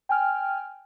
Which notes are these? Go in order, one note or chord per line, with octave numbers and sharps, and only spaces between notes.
G5 G#5 F6